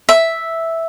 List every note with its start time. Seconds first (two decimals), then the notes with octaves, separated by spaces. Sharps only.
0.09 E5